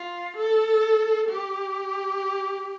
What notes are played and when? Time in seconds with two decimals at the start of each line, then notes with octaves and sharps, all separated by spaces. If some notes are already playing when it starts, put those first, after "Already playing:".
Already playing: F4
0.37 A4
1.29 G4